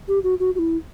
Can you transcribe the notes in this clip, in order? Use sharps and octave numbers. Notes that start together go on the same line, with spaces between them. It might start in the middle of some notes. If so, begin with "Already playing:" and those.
G4
F#4
F#4
F#4
E4